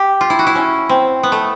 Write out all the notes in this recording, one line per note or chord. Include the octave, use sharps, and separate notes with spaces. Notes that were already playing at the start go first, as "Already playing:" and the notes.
Already playing: G4
F4
E4
F#4
E4
C#4
C4
B3
A3